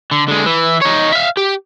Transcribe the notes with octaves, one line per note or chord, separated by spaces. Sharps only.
D3
D3 G#3
E3
D#4 C#5
E5 F5
G4